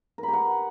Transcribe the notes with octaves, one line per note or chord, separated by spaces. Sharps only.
A#4
B5
G4
F#5